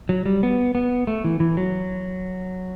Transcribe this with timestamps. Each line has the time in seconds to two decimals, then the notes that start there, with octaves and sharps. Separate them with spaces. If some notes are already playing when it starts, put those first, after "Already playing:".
0.09 F#3
0.26 G3
0.43 B3
0.75 B3
1.07 A3
1.24 E3
1.40 E3
1.57 F#3